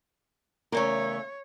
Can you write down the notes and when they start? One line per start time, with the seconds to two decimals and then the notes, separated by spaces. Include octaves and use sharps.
0.72 E2 C#3 A3 A#4 C#5